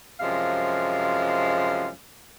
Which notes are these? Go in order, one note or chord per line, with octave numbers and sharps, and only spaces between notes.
F#2 C3 F3 G#3 F5